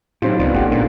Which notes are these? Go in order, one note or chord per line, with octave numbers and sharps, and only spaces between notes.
A2 F#3 C4 C#4 D#4 F4 G4 C5
C#2 B3 F4 B4 D5
G#1 A3 F4 G4 F#5
A#2 A#3 D4